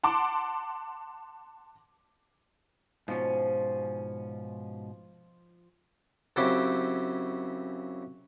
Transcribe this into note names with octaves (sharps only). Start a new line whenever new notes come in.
F#5 A5 C6 D6
G#2 B2 F3 C#4
F#2 C#3 C4 E4 G4 G5